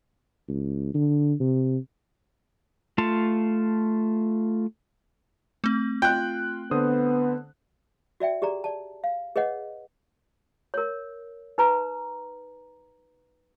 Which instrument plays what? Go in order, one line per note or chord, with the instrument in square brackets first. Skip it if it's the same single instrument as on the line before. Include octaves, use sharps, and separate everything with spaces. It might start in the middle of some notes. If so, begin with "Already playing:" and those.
[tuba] C#2
D3
C3
[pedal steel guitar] A3 F4 A5
[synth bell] A3 C4
[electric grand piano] F4 F#6 [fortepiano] G5
[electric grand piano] D3 C5 D#6 [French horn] B3
[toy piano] F#4 D5 E5 G5
G4 G#4 D5 A#5
D5 A5
F5
G#4 B4 C#5 D#5 F#5
A#4 C#5
D#4 B4 A#5